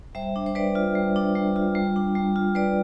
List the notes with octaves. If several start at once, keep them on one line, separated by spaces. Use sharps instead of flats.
G3 C5 E5
D4
C5
G3 B4 D5
F4
G3
D4
G3
F4
G3
D4
G3
F4
G3 B4 D5